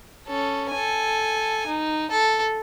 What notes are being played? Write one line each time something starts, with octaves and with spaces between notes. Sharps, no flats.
C#4 A4
A4 G#5
D#4
A4